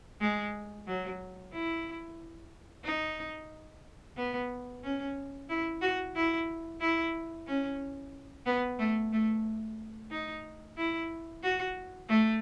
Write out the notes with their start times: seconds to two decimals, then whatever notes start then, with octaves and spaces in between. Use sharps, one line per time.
0.21 G#3
0.87 F#3
1.52 E4
2.84 D#4
4.17 B3
4.83 C#4
5.50 E4
5.82 F#4
6.16 E4
6.81 E4
7.47 C#4
8.46 B3
8.79 A3
9.13 A3
10.11 D#4
10.77 E4
11.43 F#4
12.09 A3